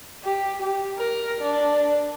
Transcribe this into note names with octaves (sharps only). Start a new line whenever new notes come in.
G4
G4
A#4
D4